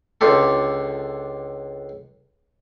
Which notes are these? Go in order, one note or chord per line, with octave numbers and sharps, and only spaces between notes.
C#2 D3 F4 G4 A4